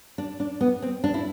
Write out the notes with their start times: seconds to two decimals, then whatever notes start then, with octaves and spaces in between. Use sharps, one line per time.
0.18 D4
0.40 D4
0.61 B3
0.82 C4
1.04 D4
1.14 E4